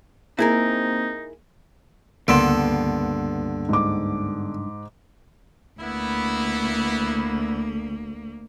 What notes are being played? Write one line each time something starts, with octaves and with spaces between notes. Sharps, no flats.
A#3 C4 D#4 E4 G#4 A#4
C#2 G2 D3 A#3 B3 A4 C6 D7
G#2 D6
D2 A#3 B3 E4